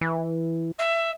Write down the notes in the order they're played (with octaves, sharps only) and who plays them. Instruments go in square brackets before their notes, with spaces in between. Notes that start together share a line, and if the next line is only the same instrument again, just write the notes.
[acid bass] E3
[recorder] E5